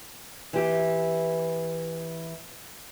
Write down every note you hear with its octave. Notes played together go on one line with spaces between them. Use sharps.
E3 G4